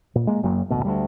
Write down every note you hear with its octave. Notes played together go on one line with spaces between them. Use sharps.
A#2
G#3 A#3
F#1 F#2 F#3 A#3
A1 D2 B2
D2 G3